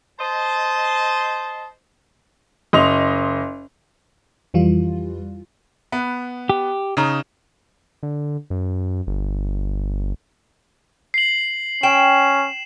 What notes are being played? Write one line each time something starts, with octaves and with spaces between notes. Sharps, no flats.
C5 D#5 A5
F#1 D#5 C6 F7
F2 E3 G3 F4
B3
G4
C#3 D#4 A#5
D3
F#2
G1
C7 F#7
C#4 G5 E7